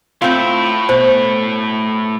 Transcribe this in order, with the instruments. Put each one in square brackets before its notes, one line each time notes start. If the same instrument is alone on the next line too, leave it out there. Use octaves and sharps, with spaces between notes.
[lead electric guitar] A2 E4 [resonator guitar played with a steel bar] C4 F4
[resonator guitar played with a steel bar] B2 [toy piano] C5